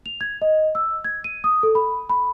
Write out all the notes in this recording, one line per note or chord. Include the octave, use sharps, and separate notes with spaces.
F7
G#6
D#5
E6
G#6
D#7
D#6
A4
B5
B5